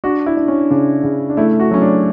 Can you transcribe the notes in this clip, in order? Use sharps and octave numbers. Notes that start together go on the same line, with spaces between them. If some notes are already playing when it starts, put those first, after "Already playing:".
D4 F#4
E4
D4
C#4
C#3 D4
C#3
D4
A3 E4
F#4
F#3 C#4
D4